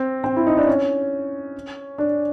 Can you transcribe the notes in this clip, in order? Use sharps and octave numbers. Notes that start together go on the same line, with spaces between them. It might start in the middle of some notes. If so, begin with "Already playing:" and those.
Already playing: C4
C4
E4
D#4
D4
C#4
D4